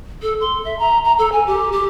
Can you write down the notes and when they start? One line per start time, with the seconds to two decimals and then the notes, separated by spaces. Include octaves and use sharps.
0.22 A4
0.41 C6
0.65 E5
0.79 A#5
1.04 A#5
1.18 A4
1.32 G#5
1.46 G4
1.72 G4